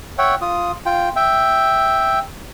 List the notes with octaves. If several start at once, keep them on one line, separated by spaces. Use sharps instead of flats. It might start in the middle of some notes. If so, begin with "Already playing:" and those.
C#5 E5 F#5 G5
F4 D#6
F4 G5
E5 G5